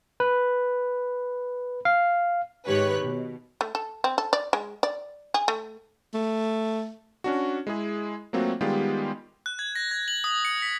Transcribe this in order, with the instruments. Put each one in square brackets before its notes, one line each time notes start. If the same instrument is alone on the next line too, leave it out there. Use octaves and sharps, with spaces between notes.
[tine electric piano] B4
F5
[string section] G#2 D#3 G4 B4 C#5 F#6
B2
[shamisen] A3
A4
C4
A4
D5
G#3
D5
G#4
A3
[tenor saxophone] A3
[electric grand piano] C#4 D4 F#4
G#3 E4 G#4
F#3 A3 A#3 C4 F4 F#4
D#3 G3 G#3 B3 F4 G4
[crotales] F#6
G#6
A#6
G#6
F#7
D#6
C#7
B6